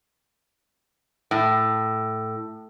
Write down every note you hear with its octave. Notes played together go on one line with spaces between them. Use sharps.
A2